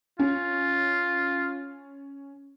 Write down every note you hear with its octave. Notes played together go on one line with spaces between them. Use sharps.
C#4 F4